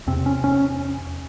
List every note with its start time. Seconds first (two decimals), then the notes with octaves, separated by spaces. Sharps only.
0.07 E2 C3 C4
0.26 C#4
0.44 C#4